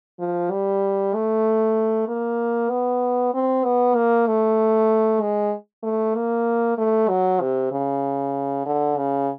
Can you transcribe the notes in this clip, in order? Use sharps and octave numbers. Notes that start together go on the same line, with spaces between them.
F3
G3
A3
A#3
B3
C4
B3
A#3
A3
G#3
A3
A#3
A3
F#3
C3
C#3
D3
C#3